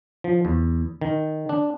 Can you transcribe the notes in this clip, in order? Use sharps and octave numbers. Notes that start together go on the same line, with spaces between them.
F3
E2
D#3
D4